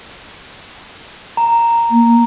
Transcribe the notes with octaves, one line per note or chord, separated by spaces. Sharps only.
A#5
A#3